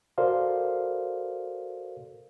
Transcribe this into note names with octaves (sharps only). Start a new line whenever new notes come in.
F#4 A4 A#4 C5 D5 F5